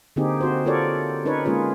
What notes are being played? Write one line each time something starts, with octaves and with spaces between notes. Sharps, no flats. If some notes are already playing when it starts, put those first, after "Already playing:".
D3 A#3 C4 D#4 G4 G#4
C4 F#4 C5
F4 G4 A4 A#4 C#5 D5
C#4 D#4 A#4 B4 C#5
G#3 A#3 C#4 F4 G#4 C#5